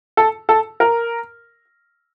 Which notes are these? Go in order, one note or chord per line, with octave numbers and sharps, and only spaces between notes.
A4
A4
A#4